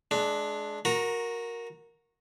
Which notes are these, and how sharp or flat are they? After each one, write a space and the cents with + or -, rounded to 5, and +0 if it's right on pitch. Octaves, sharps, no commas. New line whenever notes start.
G#3 +30 D4 +0
F#4 -20 A#4 +0 A#5 +15